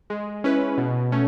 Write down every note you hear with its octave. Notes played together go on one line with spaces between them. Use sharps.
G#3
C#4 E4 B4
B2
A3 C#4